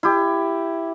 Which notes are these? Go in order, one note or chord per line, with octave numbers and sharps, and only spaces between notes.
E4 G4